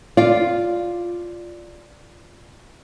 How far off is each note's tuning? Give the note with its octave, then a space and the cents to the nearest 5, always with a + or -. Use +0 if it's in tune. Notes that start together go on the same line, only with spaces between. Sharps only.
F4 +0 D5 +0